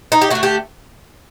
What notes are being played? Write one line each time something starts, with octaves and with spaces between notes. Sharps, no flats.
D#4
G4
D3 A3 F#4
G4